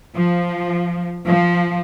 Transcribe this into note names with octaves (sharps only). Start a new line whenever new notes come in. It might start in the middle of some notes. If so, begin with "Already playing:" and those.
F3
F3